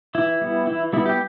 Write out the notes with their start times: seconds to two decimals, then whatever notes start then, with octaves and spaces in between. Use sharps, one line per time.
0.15 E3 E4
0.41 G3 B3
0.67 E3 E4
0.93 G3 B3 E4
1.06 G4